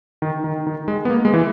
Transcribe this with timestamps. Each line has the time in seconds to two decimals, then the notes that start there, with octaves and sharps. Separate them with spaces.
0.22 D#3
0.44 D#3
0.67 D#3
0.88 G#3
1.05 B3
1.10 A#3
1.25 G#3
1.34 E3